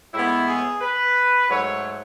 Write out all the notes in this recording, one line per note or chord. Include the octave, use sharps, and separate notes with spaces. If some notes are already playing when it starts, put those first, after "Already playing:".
A2 G#3 B3 E4
G#4
B4
G#2 F#3 A3 C#5